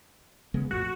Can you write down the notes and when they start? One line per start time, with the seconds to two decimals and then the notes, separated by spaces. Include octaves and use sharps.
0.54 C#3 G#3 B3
0.71 A#1 F2 A2 F#4